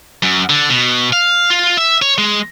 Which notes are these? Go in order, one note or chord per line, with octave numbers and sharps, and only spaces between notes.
F#2
D3
B2
F5
F4
E5
C#5
G#3